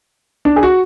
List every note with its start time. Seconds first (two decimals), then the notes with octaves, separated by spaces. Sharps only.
0.45 D4
0.56 G#4
0.63 F#4